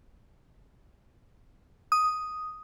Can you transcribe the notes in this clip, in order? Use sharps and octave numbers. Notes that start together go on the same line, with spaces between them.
D#6